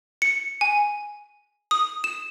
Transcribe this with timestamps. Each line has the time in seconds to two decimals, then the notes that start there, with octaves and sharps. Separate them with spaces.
0.22 C#7
0.61 G#5
1.71 D#6
2.04 E7